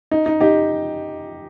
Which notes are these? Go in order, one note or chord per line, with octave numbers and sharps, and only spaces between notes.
D#4
D#4
D#4 G4